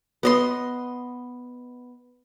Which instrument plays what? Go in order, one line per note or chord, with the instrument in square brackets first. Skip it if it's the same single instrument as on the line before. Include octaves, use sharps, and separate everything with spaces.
[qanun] B3 D#5 C6